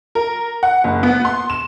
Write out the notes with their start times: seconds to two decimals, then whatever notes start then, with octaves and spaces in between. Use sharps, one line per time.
0.15 A#4
0.63 F#5
0.84 F#1
1.03 B3
1.25 C6
1.50 E7